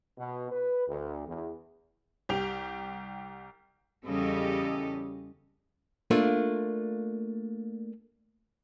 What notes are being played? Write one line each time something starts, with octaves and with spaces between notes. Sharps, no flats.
B2
B4
D2
E2
C2 G4 F7
E2 C#3 G3 G4 A4 D#5
A3 A#3 D4 F4